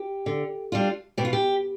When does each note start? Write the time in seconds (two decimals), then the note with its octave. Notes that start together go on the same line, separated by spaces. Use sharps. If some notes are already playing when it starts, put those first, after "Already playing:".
Already playing: G4
0.26 D3
0.72 G3 D4 F4
1.18 B2 G4
1.25 F4
1.33 G4